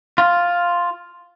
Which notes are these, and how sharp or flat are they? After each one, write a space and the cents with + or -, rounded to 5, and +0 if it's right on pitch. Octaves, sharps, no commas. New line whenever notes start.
F4 +0